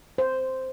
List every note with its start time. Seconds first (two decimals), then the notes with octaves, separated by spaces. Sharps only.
0.18 C5